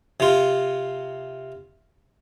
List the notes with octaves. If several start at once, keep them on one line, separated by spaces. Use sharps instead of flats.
C3 F4